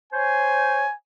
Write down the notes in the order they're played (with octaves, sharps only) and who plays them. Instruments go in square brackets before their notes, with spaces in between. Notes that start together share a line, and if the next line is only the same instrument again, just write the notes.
[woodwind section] C5 C#5 [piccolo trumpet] G#5